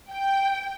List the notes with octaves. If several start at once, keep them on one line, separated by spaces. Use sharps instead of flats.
G5